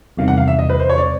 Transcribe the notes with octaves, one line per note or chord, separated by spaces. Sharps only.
E2 C3 D#3 G3 F5
F#5
F5
E5
D#5
B4
C5
C#5
D5